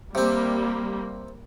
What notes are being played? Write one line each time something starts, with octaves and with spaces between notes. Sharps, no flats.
C3 G3 A#3 C4